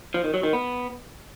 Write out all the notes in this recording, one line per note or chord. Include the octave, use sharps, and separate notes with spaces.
F3
D#3
F#3
D#3
B3